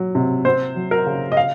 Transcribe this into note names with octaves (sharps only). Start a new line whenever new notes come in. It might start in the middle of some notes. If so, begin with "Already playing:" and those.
Already playing: F#3
C3
C4 C5
F#3
A#4
C#3
D#5
F5